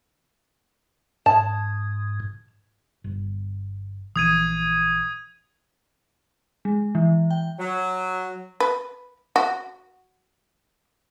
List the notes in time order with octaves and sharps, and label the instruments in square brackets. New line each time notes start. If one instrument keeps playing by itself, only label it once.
[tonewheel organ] G#2 [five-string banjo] A5
[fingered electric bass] G1
[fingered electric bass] A#1 E3 [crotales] D#6 G#6 D#7
[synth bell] G#3
E3
G5
[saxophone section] F#3
[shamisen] B4
F#4